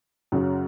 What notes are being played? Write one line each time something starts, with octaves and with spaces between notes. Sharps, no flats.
F#2 C#3 F#3